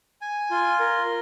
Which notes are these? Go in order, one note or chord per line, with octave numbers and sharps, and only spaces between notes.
G#5
F4
A#4